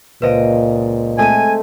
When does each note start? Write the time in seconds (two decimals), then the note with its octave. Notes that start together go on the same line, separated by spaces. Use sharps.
0.22 C#2 A#2 B4 C5 D#5 F5 D7
1.18 G#3 A3 C4 A4 G#5 D#7